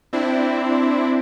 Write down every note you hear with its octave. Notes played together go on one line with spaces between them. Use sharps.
C4 D4 E4